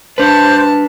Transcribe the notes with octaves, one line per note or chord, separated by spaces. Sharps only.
D4 B4 C5 A5